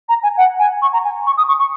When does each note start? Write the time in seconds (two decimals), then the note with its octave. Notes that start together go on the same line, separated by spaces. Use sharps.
0.09 A#5
0.23 G#5
0.37 F#5
0.59 G#5
0.82 C#6
0.93 A#5
1.04 G#5
1.26 C#6
1.37 D#6
1.48 C#6
1.59 C#6